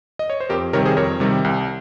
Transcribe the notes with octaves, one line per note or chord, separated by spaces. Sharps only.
D#5
C#5
C5
F2 G4 A#4
C3 D#3 G3 A#4 C#5
G#4 C5
F2 A#4 C#5
C3 D#3 G3
C2